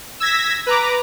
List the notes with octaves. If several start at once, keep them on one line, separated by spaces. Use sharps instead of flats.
E6 G#6 A#6 B6
B4 A#5 D6